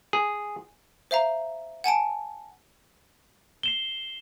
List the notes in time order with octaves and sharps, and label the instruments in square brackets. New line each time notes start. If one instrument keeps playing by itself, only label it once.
[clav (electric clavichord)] G#4
[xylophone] C5 E5 F5 A#5
F#5 G#5 A5 D7
[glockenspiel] C7 E7 G7